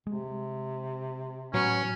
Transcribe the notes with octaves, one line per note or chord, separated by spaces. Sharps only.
C3 G#3
A2 F#3 B3 C#4